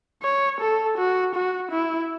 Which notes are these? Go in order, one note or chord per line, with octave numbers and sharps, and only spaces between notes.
C#5
A4
F#4
F#4
E4